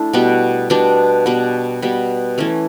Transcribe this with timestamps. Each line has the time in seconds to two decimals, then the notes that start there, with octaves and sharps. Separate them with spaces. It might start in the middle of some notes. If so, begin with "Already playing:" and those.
Already playing: A3 D4 E4
0.13 B2 G3 B3
0.70 B2 G3 B3 D4
1.26 B2 G3 B3
1.82 B2 G3 B3
2.38 E3 A3 C#4